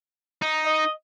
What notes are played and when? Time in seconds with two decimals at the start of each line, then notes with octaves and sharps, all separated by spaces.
0.42 D#4
0.66 D#5